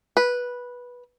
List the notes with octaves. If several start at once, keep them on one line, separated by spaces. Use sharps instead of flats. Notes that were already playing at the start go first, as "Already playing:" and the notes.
B4